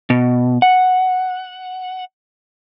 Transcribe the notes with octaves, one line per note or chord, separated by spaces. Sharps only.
B2
F#5